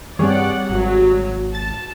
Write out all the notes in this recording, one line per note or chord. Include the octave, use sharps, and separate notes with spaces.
G2 E3 G3 C4 G#4 C#5 D5 F#5
G#1 F#3
A5 A6